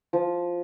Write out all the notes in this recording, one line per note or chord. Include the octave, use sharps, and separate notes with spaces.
F3